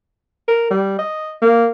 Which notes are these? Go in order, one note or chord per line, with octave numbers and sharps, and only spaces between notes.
A#4
G3
D#5
A#3